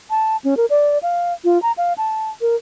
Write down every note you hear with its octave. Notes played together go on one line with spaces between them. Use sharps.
A5
C#4
A#4
D5
F5
F4
A#5
F5
A5
A#4